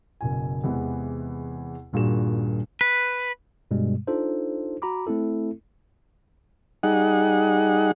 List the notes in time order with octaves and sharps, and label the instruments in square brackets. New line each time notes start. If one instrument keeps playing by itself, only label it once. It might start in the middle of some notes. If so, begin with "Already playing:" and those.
[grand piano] F#1 B2 G#5
E2 C3 E3 G#3 B3
D#1 G2 A#2 F#4 G#4 E7
[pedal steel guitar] B4
[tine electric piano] G2 B2 G3 G#3
D4 D#4 F4 A4 C5
F#4 A#5 B5 D6
A3 C4 E4 A4
[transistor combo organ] G3 D#4 G#4 F#5